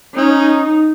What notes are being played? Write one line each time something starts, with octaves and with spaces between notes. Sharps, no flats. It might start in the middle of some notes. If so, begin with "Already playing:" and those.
C#4 D#4